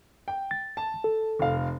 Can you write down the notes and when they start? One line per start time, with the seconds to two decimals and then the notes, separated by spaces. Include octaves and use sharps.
0.28 G5
0.51 A6
0.77 A5
1.04 A4
1.39 F1 F5